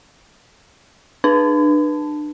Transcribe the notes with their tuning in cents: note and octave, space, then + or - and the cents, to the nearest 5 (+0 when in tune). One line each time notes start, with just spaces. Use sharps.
D4 +35 B4 -15 A5 +0